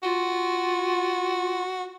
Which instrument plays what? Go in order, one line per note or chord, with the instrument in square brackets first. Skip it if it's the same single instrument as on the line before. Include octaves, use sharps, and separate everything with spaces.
[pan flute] F4 [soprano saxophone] F#4